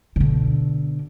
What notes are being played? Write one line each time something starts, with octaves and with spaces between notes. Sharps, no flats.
B2 D3